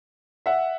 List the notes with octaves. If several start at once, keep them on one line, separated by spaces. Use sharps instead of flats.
E5 F#5